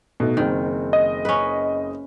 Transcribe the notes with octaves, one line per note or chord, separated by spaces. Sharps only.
B2 A3 D#4
F#1 D#3 C4
D#5
C#4 B4